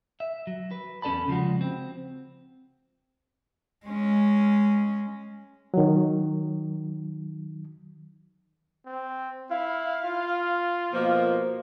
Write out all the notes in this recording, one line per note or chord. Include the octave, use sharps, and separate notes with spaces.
E5
F#3
B4
E2 C#4 A4 D5 A5 B5
C#3 F3 G#3 F#4
C4
G#3 C#4
D#3 F#3
C4
E4 F5
F4
B2 F3 A#3